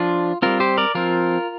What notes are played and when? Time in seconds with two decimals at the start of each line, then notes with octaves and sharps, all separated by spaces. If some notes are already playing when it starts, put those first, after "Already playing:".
Already playing: F3 D4 F4
0.42 G3 C4 F4 A#4
0.60 G4 C5
0.77 A#4 D5
0.95 F3 C4 F4 A#4